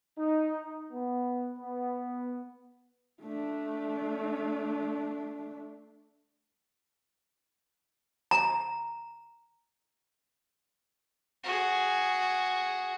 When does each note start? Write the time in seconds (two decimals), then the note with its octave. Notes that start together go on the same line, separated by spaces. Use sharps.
0.19 D#4
0.92 B3
1.58 B3
3.22 A3 D4
8.31 A#5
11.43 F#4 G#4